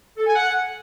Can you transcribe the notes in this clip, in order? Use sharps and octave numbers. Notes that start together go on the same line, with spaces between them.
A4
G#5
F#5